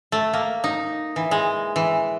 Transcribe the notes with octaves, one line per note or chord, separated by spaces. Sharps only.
A3
A#3
D#4
E3
G#3
E3